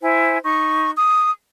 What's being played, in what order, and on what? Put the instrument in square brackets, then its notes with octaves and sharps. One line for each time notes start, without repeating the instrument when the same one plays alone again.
[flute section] E4 C5 G#5
D#4 C#6
D#6